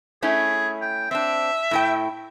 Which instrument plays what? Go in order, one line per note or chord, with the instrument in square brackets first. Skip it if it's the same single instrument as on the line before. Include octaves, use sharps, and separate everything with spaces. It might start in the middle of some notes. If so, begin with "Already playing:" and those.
[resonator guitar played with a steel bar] A3 C#4 E4 [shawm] G#4
[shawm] G5
[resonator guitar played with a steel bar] C4 D4 [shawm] E5
[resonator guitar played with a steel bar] A2 E4 G5